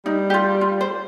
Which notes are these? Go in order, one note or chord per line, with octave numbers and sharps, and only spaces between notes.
G3 D#4
G4
F4
F4
C5